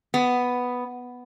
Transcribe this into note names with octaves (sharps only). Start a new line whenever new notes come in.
B3